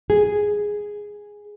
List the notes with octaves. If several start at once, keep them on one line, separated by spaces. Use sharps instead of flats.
G#4